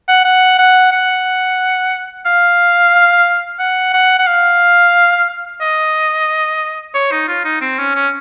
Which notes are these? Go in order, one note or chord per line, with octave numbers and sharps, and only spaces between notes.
F#5
F#5
F#5
F#5
F5
F#5
F#5
F#5
F5
D#5
C#5
D#4
F4
D#4
C4
C#4
C#4